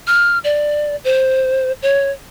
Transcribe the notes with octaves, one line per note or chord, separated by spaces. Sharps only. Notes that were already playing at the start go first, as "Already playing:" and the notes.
F6
D5
C5
C#5